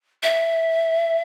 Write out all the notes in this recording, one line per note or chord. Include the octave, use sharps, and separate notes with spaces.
E5